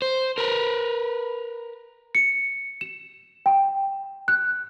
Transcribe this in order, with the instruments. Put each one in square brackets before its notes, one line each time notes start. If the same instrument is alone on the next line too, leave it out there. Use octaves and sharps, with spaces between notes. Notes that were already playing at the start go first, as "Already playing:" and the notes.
[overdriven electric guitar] C5
A#4 B4
[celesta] C#7
E7
G5
F#6